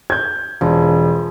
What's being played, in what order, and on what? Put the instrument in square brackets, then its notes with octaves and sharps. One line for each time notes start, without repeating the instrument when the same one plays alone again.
[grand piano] G6 G#6
[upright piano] E1 [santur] F3